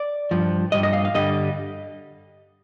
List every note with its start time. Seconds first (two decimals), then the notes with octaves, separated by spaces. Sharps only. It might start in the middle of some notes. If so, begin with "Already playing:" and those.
Already playing: D5
0.31 G2 F3
0.72 G2 D#3 G3 D#5
0.83 D#5
0.93 F5
1.05 F5
1.14 G2 D3 G3 D#5